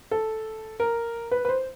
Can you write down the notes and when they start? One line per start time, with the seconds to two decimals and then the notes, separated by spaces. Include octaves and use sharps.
0.11 A4
0.80 A#4
1.31 B4
1.45 B4
1.49 C5